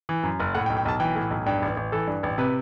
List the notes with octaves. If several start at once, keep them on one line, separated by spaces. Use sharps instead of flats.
E3
F#2
F#1
A2 F#5
G5
B1
G5
B1 A5
E3 G5
A2
B1
G2 G5
A1
A1
E3 A4
G2
A1
C3 B4